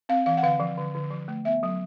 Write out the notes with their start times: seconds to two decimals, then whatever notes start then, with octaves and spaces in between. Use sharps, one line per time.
0.09 C4 F5
0.26 E3 F5
0.37 F#5
0.43 D3 F5
0.60 F3
0.77 D3
0.95 D3
1.11 F3
1.28 A3
1.45 B3 E5
1.63 F#3